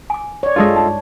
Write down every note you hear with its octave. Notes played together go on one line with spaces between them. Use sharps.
G#5 D6
C#5 D5
G2 G#3 F4 A4 D#5
D#4